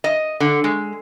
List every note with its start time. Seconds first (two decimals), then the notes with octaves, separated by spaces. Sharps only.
0.04 D#5
0.40 D3
0.64 G#3